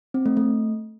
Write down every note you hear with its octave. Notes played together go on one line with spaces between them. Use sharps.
C4
A3
A3